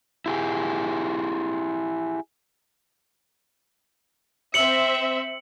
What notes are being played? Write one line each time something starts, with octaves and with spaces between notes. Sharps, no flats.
E4 G4 G#4
C4 E5 C#7 F#7